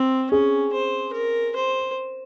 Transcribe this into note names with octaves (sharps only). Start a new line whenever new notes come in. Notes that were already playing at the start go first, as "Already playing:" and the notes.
Already playing: C4
C#4 G#4
C5
A#4
C5